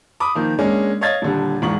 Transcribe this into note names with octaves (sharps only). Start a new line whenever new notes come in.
B5 D6 D#6
D#3 F3 A#3
G#3 A#3 C#4 D4
C#5 D#5 F5 G#6 A6
D#1 D3 G3
E1 G#2 F4 C#6 F#7